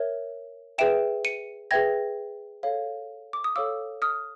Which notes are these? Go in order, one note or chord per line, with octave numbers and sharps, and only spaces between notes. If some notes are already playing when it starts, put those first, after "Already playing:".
Already playing: A#4 C#5 E5
G#4 B4 E5 G5 D7 E7
C#7 D#7
G#4 B4 E5 G5 G#6 A#6
A4 C#5 F5
D6
D#6
A4 C#5 F5 D6 E6
D#6 F6